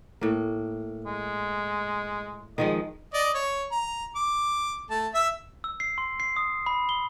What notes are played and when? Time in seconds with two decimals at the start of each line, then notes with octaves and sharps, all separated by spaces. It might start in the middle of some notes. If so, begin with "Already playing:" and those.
0.21 A2 A#3
1.05 G#3
2.58 D#3 F3 G#3 D#5
3.14 D5 D#5
3.35 C#5
3.72 A#5
4.16 D6
4.90 A3 A5
5.14 E5 E6
5.64 E6
5.80 C7
5.98 C6
6.20 C7
6.36 D#6
6.66 B5
6.89 G7